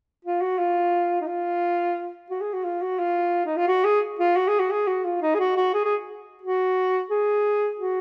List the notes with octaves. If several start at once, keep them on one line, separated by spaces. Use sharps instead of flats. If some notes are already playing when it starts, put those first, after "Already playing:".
F4
F#4
F4
D#4
F4
F#4
G#4
F#4
F4
F#4
F4
D#4
F4
F#4
G#4
F4
F#4
G#4
F#4
G#4
F#4
F4
D#4
G#4
F#4
F#4
G#4
G#4
F#4
G#4
F#4